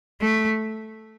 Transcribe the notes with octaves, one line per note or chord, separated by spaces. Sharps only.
A3